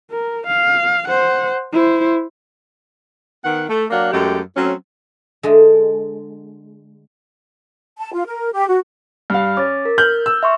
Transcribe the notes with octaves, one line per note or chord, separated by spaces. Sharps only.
A#4
F5
C5 F#5
E4 C5
D#3 B3 F#5
A3
F#3 A#3 D4 F5 F#5
F#2 G#3 A3 G4
F#3 A3 C4 C#4
D3 G#3
A5
F4
A#4
G4
F#4
G2 F5 F6
C#4 D6 A6
A#4
F6 G6 F#7
E6
E5 C6 C#6